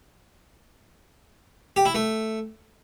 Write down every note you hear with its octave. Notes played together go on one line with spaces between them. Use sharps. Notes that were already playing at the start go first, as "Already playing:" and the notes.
G4
E4
A3